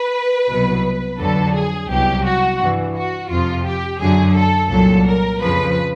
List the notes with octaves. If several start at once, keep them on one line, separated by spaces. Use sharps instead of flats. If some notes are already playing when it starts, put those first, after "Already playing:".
Already playing: B4
C2 B2 F#3
F2 D3 F#3 A4
G#4
C2 B2 F#3 G4
F#4
G2 E3
F#4
F2 C3 F3 F4
G4
F#2 D3 F#3 G#4
A4
C2 A#2 F#3 A4
A#4
F2 C#3 F3 B4